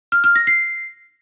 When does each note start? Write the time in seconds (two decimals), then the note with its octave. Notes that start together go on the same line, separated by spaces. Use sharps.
0.12 F6
0.24 F6
0.36 A#6
0.47 C7